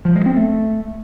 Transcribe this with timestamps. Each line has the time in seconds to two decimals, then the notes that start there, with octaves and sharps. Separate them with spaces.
0.05 F3
0.15 G#3
0.26 C4
0.36 A3